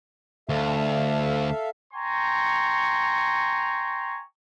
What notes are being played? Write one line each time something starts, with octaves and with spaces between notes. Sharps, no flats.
D2 A4 E5 F5
G5 G#5 A#5 C6 C#6